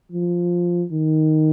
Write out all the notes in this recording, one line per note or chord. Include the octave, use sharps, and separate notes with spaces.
F3
D#3